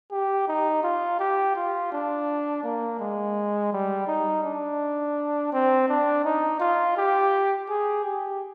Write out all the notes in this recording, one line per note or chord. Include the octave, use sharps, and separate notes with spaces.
G4
D#4
F4
G4
F4
D4
A#3
G#3
G3
D#4
D4
C4
D4
D#4
F4
G4
G#4
G4